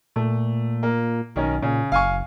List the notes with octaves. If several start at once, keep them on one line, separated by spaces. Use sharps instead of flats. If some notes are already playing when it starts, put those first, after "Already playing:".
A#2 A3
A#3
B1 D#3 C#4 D#4
A#2 C#3
F#1 F5 G#5 C#6